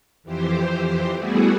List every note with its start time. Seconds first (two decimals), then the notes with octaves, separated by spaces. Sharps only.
0.23 F2 E3 G4 C5
1.17 G3 A3 B3 E4 F#4 G#4